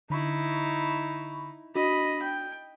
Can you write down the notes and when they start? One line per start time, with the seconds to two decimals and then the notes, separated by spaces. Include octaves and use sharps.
0.10 D3 D#4 E4 B5 C#6
1.75 D4 F#4 D#5 B5
2.23 G5